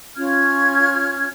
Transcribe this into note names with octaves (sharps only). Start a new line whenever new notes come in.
C#4 F4 F6 G#6